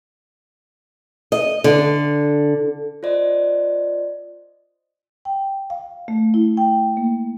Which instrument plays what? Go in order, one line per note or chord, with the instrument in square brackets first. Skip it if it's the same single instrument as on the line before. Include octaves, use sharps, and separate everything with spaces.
[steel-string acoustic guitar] D#5
D3
[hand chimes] F4 C5 D5 D#5
[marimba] G5
F5
A3
E4
G5
A#3